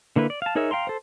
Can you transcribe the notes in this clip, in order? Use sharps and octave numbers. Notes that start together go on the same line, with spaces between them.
D3 A#3 E4 B4
D5
F5 A5
D#4 G#4 A#4 C#5 E5
F5 G5 A#5 C6
A4 C5